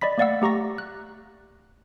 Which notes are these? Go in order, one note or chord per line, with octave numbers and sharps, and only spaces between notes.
D5 D#5 B5 B6
A3 A#3 D5 F5 F#5 E6
A3 G4 A#5 C#6 A#6
F#6